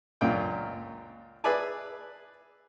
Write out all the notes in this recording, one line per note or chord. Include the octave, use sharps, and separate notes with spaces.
C#2 F#2 A#2 D4 F4 G5
G#4 B4 D5 E5 G#5 A5